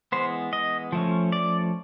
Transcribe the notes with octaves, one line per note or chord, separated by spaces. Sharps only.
E3 G#3 B3 C5
D#5
F3 A3 C#4
D5